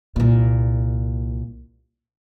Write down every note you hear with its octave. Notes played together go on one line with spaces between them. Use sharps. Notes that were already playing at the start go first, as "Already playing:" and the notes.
C2 A#2